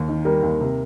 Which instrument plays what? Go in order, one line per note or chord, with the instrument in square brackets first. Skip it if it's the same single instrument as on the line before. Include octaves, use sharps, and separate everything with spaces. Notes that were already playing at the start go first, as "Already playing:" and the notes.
Already playing: [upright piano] D#2
D#3
[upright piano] G3 [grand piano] A#4
[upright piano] D#2
C3